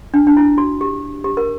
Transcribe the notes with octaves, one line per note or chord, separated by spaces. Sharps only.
D4
D4
E4
F#4
G4
G4
A#4